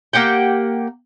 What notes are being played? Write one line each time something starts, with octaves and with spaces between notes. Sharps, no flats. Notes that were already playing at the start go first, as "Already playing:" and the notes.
A#3 G4 F#5 G5